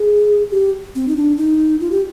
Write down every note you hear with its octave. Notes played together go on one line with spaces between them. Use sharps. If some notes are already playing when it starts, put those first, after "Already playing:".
Already playing: G#4
G4
C4
D#4
D4
D#4
F4
G4